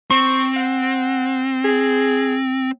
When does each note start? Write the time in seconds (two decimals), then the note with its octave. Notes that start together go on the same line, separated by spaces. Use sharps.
0.11 C4 C#6
0.56 F#5
1.64 G#4